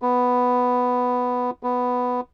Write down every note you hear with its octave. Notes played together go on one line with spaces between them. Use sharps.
B3
B3